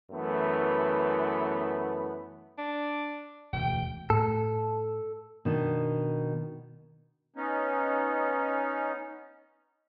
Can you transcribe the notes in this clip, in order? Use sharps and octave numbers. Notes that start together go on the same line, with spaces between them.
F#2 E3 A3 B3
D4
E1 D2 G5
A2 A4
B2 D#3 D4
B3 C#4 D#4